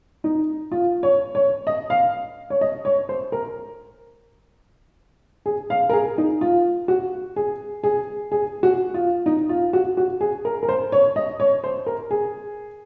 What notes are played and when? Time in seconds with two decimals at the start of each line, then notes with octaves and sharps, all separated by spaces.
0.24 D#4
0.72 F4
1.03 C#5
1.35 C#5
1.67 D#5
1.90 F5
2.50 C#5
2.61 D#5
2.85 C#5
3.09 C5
3.32 A#4
5.46 G#4
5.70 F5
5.89 A#4
5.93 G#4
6.18 D#4
6.41 F4
6.88 F#4
7.36 G#4
7.83 G#4
8.32 G#4
8.63 F#4
8.94 F4
9.26 D#4
9.49 F4
9.73 F#4
9.97 F#4
10.21 G#4
10.45 A#4
10.63 A#4
10.69 C5
10.92 C#5
11.16 D#5
11.40 C#5
11.64 C5
11.86 A#4
12.11 G#4